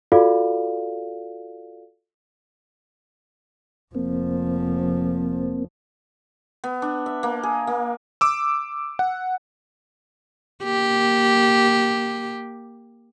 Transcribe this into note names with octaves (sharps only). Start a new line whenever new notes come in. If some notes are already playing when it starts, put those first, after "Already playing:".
F4 F#4 A4 D5 F5
F1 F3 A#3 C4
B3
D4
E5
A#3
G#4
A#3
D6 E6
F#5
A#3 G4